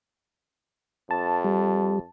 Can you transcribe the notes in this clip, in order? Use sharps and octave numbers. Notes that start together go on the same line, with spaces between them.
F2 A5
G3